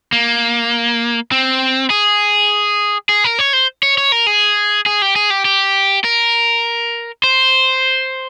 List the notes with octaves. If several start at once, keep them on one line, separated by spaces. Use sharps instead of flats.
A#3
C4
G#4
G#4
A#4
C#5
C5
C#5
C#5
A#4
G#4
G#4
G4
G#4
G4
G4
A#4
C5